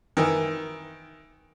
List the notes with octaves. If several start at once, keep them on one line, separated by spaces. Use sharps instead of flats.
D#3 E3